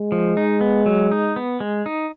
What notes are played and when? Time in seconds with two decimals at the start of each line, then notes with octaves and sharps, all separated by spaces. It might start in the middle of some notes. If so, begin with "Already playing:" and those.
Already playing: G#3
0.12 F3
0.37 D#4
0.61 B3
0.86 F#3
1.12 D#4
1.36 B3
1.60 G#3
1.86 D#4